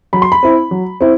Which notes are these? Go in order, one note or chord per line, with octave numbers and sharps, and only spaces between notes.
F#3 B5
C6
B5
C4 E4
F#3
C4 E4